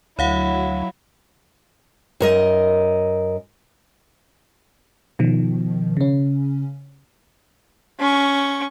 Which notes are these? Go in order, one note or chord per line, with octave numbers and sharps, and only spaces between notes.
D2 F#3 E4 C#5 F5 F#5
F#2 A#4 D#5
B2 D#3 F3
C#3 C#4
C#4 C#6